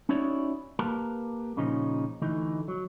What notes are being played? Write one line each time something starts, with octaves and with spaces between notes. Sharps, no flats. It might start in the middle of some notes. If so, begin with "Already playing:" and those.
C#4 D#4 E4 F#4 C#5 D5
A#3 G4 A#4 B4 A5 A#5
A#2 C#3 F3 C#4 D#4
D2 E3 A3 D#4
F#3